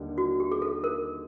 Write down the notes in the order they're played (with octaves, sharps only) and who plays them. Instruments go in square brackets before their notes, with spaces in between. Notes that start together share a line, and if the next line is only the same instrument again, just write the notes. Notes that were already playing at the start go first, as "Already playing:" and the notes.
Already playing: [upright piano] D#2 D3 G3
[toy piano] F#4
G4
G#4
A4
A#4